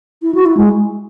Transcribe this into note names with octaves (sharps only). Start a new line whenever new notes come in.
E4
F#4
E4
G#3